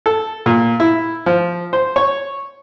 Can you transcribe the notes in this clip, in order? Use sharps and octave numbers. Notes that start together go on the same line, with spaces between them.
A4
A#2
E4
F3
C5
C#5